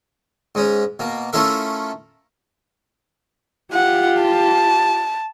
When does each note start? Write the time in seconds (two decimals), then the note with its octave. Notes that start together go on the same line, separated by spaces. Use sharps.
0.55 G#2 G#3 C#4
0.99 B2 A#3
1.33 A3 C#4 E4 F4 A4 A#4
3.73 F4 G4 F#5
4.23 A5